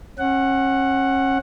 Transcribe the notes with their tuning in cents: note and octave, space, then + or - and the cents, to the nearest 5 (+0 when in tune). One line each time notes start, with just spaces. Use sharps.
C#4 -35 F#5 +5